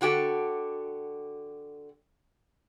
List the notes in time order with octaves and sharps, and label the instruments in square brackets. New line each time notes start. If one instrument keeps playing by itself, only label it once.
[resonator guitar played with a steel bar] D3 F#4 G4 A4